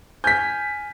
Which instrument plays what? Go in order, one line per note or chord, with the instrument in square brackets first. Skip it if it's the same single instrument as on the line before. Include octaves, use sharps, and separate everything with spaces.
[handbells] G#5 F6 G#6 [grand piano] G6 B6